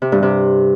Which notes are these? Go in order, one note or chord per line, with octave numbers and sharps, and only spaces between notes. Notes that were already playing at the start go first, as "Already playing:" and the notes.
C3
G2
C3